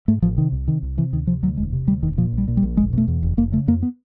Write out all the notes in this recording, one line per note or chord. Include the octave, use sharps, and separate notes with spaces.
G#2 A3
A1 F3
C3 D#3
C2
C3 D#3
C2
C3 E3
D2 D#3
C3 F3
D2 F#3
E1 G#3
C3
D2 G3
E1 D#3
A#2 F3
A#1
G3
A#2
G3
A#1
F1 G#3
B2 A3
E2
F1
F1 A#3
C#3 A3
F2 A#3
B3